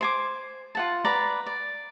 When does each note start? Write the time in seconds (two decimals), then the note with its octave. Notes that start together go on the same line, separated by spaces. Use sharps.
0.01 C5 G#5 D6
0.75 F4 F#5 A5
1.05 B4 D5 A#5
1.46 D5